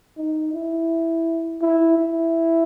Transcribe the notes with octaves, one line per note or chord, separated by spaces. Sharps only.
D#4
E4
E4
E4